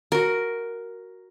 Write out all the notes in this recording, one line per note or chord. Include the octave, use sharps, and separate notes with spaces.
F#4 A#4